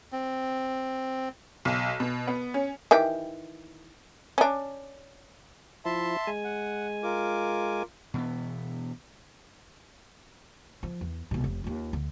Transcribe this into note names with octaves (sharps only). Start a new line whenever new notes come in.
C4
B1
B2
B3
C#4
D#3 E3 G4
C#4 D4
F3 E4 E5 A5 C6
G#3 G#5
F#5
F4 A#4 D6
B2 E3 B3
F3
E2
C2 B2
F1
D#2 F4
D2